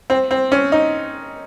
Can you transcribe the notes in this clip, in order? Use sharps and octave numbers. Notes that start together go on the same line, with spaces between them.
C4
C4
C#4
D#4